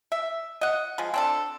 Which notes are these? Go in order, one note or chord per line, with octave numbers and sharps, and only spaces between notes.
E5
D#5 F#5
F3 G#3
C4 D4 A4